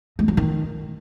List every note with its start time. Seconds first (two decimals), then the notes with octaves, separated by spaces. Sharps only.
0.19 G#3
0.28 F#3
0.37 D#3